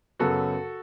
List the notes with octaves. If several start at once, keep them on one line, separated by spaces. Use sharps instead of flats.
F#2 C#3 F#3 B3 F#4 A4